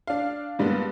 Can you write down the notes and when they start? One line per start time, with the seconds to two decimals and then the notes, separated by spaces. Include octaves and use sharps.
0.07 D4 F5
0.59 G2 G3 G#3 A#3 B3